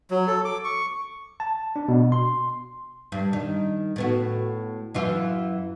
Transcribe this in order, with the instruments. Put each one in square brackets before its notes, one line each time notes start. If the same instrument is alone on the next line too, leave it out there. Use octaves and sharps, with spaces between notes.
[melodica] F#3
A4
D6
C#6
[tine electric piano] A5
D4
B2
C6
[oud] G2
D#3
A2 B3 F#4
F#2 E3 F4